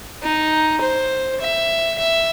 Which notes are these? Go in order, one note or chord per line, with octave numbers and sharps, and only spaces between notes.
D#4
C5
E5
E5